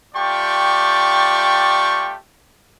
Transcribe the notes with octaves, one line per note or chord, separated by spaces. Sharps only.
A3 F4 G4 D5 G5 C#6